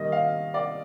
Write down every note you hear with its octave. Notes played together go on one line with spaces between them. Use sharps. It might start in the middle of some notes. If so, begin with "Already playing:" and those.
Already playing: D#3 G3 A#3 D#5
F5
D5